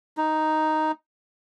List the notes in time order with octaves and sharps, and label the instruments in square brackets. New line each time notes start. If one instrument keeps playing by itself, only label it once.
[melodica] D#4